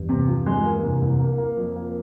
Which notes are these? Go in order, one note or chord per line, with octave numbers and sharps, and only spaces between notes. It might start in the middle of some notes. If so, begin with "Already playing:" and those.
Already playing: E2 G2
C3
F3
G#3
A#3
C2
C2
A#3
A#3
F2
A#3